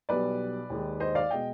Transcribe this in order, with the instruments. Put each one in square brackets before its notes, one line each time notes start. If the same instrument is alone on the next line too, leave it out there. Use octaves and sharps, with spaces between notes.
[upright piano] B1 B2 G3 B4 D5
D#2 D#3 G#3
C5 D#5
D5 F5
B2 G#3 D#5 G5